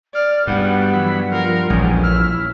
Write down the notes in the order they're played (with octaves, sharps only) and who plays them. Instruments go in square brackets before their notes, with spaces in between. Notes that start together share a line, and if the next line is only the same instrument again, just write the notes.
[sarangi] D5 [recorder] F6
[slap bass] G2 [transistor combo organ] G3 F#4 [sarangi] B3 [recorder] F#5
[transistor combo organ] E3 F#3 B5
[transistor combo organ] F3 F4 [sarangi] A#4
[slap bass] A#1 E3 [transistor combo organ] D#2 G3 G#3 [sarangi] C#4
[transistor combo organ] E4 [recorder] F6